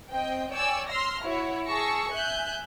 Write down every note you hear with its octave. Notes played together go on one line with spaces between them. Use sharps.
C4 D#5 G5
C#5 D5 G5 G#5 E6
C6 E6 F6 A#6
E4 F#4 C#5
G#4 A5 C#6 E6 A#6 C#7
E5 G#5 F#6 G6